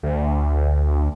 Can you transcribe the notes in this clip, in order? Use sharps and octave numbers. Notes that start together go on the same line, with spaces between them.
D2